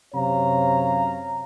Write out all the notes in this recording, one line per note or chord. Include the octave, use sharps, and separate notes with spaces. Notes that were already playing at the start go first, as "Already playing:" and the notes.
F#2 C3 C#5 F5 A#5